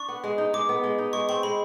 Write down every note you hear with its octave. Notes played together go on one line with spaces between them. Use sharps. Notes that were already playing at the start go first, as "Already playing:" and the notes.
Already playing: D4 C#6
B3
G#3
D#4
G#3 D6
B3
G#3
D#4
G#3 C#6
C4 C#6
G#3 B5